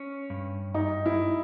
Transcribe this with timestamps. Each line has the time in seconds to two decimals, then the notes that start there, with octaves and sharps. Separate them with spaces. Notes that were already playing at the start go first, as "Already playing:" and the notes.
Already playing: C#4
0.30 G2
0.74 G2 D#4
1.06 E4